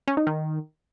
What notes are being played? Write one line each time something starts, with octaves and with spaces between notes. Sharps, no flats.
C#4
D#4
D#3